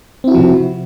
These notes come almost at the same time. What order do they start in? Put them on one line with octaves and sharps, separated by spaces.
C4 E4 F#4 F3 C3